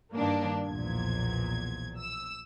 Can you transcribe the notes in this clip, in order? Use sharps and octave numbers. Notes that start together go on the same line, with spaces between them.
G2 D#3 A#3 D4
B1 E2 A#2 F3 G#6
E6